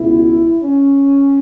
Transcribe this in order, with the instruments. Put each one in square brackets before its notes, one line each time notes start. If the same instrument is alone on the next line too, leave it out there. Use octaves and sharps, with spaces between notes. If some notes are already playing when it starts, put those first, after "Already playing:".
Already playing: [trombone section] C#2 B2 E4
C#4